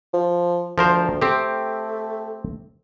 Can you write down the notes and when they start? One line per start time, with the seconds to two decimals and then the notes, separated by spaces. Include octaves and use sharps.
0.13 F3
0.78 D2 F3 A#4 C5
1.21 A3 C4 G4